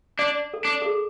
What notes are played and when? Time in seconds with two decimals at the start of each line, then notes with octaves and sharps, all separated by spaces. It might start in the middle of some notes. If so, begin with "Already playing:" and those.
0.19 D4 D5
0.54 A4
0.65 D4
0.82 A4
0.86 G#4